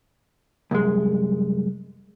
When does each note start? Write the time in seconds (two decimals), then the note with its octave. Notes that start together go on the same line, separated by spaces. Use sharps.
0.71 C2 F#2 G#3